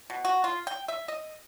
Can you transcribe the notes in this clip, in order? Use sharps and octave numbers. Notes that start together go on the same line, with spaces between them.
B2
F#4
F4
G5
E5
D#5